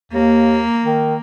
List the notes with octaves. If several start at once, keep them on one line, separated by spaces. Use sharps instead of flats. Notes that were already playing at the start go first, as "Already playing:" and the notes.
D#2 A#3
D#3